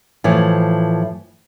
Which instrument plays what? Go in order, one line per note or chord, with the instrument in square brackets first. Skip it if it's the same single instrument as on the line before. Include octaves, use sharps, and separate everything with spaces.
[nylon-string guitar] A2 E3 F3